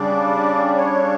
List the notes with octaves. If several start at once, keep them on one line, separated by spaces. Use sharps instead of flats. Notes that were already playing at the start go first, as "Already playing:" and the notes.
Already playing: C#3 G3 D4 D5
C#5